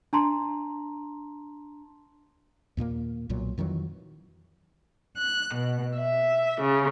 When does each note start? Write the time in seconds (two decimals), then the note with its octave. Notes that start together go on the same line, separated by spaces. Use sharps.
0.13 D4 A5 A#5 C6
2.77 D#2 A#2 A3 A#3
3.29 B1 A#2 F#3
3.58 F2 D#3 E3 F#3
5.17 F#6
5.54 B2
5.96 E5
6.61 C#3